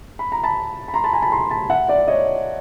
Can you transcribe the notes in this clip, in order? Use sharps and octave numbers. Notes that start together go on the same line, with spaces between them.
B5
A#5
A5 B5
B5
A#5 C6
A5 B5
G#5 A#5
A5 B5
A#5 C6
A5 B5
E5 F#5
D5 E5
C#5 D#5